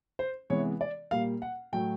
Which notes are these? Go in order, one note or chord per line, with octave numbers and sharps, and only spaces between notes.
C5
C3 E3 G#3 B3 C#5
D5
A#2 G3 A#3 F5
F#5
A2 F#3 A3 G5